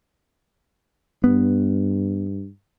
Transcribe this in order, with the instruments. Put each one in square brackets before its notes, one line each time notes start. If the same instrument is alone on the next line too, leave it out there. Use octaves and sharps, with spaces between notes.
[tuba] G2 [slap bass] B3